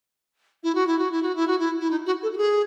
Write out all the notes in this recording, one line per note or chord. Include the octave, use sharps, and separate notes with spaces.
E4
F#4
E4
F#4
E4
F#4
E4
F#4
E4
E4
D#4
F#4
A4
F#4
G#4